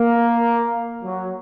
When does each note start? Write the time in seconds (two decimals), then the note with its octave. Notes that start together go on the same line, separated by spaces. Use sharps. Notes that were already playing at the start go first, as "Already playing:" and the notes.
Already playing: A#3
1.03 F#3